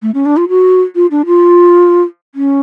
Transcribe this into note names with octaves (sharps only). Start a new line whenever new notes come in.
A3
C#4
D4
F4
F#4
F4
D4
F4
C#4